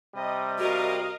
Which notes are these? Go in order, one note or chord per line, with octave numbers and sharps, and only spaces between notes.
C3 G3 D#5
F#4 A#4 D#5 F5